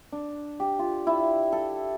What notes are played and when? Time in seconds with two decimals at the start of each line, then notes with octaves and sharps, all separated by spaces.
0.12 D4
0.60 G4
0.79 F4
1.07 E4
1.52 A4